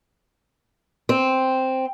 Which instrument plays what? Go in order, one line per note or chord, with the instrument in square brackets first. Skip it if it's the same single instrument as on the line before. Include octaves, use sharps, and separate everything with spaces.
[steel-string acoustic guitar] C4